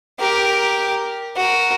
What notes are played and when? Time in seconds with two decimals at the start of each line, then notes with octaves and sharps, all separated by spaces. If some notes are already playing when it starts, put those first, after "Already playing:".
0.19 G4 A#4
1.36 F#4 A#4